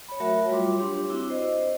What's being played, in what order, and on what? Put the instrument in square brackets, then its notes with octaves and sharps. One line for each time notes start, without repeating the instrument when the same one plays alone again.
[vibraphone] C#5 B5
F#3 A3 F#4 A#4 C#5 E5
G3 F4 C#5 C6 D6
D4 G4 C#5
C4 E4 F#4 D6
C5 D#5